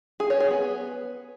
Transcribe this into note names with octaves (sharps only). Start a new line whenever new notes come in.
G#4
C#5
G#4
B3